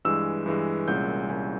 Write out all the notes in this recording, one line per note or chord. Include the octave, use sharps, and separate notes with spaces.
G2 E3 G#3 E6
G2 E3 G#3
C2 A#2 G#3 C#4 G6
C2 A#2 G#3 C#4